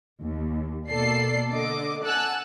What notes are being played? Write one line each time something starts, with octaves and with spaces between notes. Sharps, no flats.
D#2
B2 A#3 A4 D5 C7
D3 D#5 D6
F#5 G#5 A5 E6 F#6